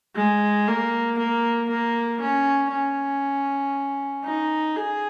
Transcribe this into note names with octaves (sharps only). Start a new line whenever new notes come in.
G#3
A#3
A#3
A#3
C#4
C#4
D#4
G#4